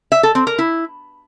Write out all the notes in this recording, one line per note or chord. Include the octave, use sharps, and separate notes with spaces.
E5
A4
C4
A#4
E4